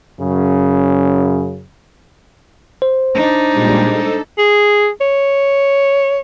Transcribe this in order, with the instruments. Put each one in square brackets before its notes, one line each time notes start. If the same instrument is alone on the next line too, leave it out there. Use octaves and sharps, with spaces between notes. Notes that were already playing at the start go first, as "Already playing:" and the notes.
[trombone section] F#2 C#3
[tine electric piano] C5
[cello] D4 D#4
[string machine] A#2 G3 G#3
A4
[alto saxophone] G#4
C#5